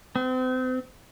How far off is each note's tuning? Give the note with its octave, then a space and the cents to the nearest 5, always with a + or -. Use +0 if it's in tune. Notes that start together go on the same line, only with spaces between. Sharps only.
C4 -35